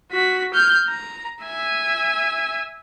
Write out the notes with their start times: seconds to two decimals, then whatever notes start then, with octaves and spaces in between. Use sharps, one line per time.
0.11 F#4 B6
0.54 F6 G6
0.89 A#5
1.43 E5 G#5